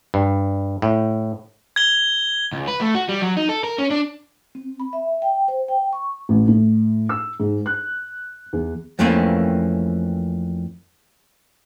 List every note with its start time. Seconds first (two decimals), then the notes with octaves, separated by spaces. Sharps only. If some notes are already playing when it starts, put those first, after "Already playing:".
0.14 G2
0.82 A2
1.76 G#6 G7
2.53 C#2
2.68 B4
2.81 A3
2.95 F#4
3.09 G3
3.22 F#3
3.37 D#4
3.49 A4
3.64 A#4
3.78 C#4
3.91 D4
4.55 C4
4.80 B5
4.93 E5
5.22 G5
5.48 C5
5.68 G5
5.93 C#6
6.29 A1
6.48 A2
7.09 E6
7.40 G#2
7.66 F#6
8.53 E2
8.99 F2 E3 A3 A#3 C4 C#4